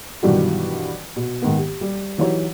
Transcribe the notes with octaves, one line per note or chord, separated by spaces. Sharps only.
G2 B2 D#3 E3 F#3 G3
B2
G#2 D#3 B3
G4
G3
E3 F#3 D#4 G4 C#5